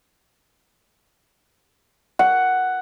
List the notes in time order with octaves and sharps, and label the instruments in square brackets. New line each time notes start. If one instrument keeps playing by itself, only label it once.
[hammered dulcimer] F#5